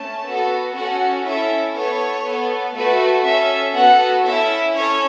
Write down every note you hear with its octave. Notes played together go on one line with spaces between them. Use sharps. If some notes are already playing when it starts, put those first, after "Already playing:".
Already playing: A3 C#4 A5
B3 F#4 A4
C#4 F#4 A4 F#5
C#4 E4 A4 E5
B3 A4 C#5
B3 A4
A3 F#4 A4 B4
C#4 A4 E5
B3 F#4 A4 F#5
C#4 E4 A4 E5
C#4 A4 C#5